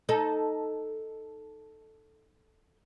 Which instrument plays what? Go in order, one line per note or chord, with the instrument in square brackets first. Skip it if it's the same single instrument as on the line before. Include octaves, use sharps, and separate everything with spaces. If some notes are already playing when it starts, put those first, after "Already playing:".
[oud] D#4 A4